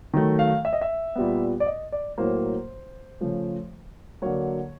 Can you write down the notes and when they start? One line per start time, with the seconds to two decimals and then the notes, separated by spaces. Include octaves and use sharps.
0.13 D#3 F#3 A3
0.39 F5
0.65 E5
0.73 D#5
0.81 E5
1.16 A#2 G3 B3
1.60 D5
1.66 D#5
1.92 D5
2.18 A2 F#3 A#3 C5
3.21 C#3 F3 A3
4.22 D3 F#3 A#3 C#5